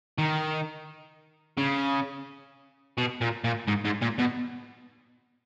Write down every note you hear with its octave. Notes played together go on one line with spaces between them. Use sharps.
D#3
C#3
B2
A#2
A#2
G#2
G#2
A#2
B2